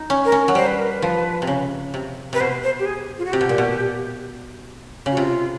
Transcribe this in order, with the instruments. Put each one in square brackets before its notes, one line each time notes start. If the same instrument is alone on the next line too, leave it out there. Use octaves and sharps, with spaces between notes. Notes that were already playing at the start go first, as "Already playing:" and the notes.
Already playing: [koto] D#4
C#4
[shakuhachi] A#4
[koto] C#4
F#3
[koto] G3 [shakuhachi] C5
[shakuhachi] B4
A#4
B4
[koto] F3
C3
C#3
C3
[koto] C3 [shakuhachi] B4
[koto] B2 [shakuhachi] C5
[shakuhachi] C5
G4
G#4
F4
F#4
[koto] C3 [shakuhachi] G4
[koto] B2
A#2
B2
C#3
[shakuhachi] F#4
[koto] C3 [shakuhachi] F4